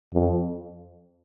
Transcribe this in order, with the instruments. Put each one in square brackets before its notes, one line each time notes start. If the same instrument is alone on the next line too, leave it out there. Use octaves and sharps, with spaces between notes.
[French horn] F2